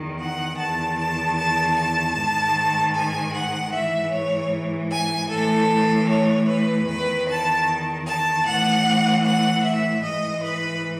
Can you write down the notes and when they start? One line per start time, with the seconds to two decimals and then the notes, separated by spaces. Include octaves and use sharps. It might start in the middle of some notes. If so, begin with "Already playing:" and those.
Already playing: E2 D#3
0.19 F#5
0.58 E2 D#3 A5
0.98 A5
1.37 A5
1.77 A5
2.16 G#2 D#3
2.95 G#5
3.34 F#5
3.74 G#2 E3 E5
4.13 C#5
4.92 G#5
5.31 A2 E3 A4
6.10 C#5
6.49 B4
6.88 E2 D#3 B4
7.28 A5
8.07 A5
8.46 A2 E3 F#5
9.25 F#5
9.64 E5
10.04 G#2 E3 D#5
10.43 B4